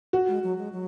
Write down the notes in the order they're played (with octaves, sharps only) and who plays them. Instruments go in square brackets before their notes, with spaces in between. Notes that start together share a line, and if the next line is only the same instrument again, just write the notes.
[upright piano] F#4
[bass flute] G#3
F#3
G#3
F#3